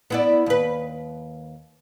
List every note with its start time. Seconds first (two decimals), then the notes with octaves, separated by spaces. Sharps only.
0.10 B3 E4 D5
0.46 D#2 B4